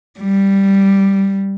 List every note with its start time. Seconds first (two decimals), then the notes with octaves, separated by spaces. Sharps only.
0.20 G3